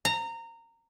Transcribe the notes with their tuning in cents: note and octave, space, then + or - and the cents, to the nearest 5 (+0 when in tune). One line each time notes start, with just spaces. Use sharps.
A#5 -20